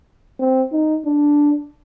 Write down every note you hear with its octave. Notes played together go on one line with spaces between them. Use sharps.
C4
D#4
D4